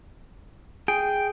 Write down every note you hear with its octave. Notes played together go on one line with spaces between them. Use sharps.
G#4 G5